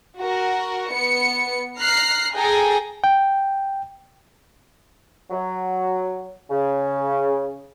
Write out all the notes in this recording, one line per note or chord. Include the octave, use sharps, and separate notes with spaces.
F#4 A#4
B3 C#7
A#5 F6 F#6 C7
G#4 A4 G5 G#5 A#5
G5
F#3
C#3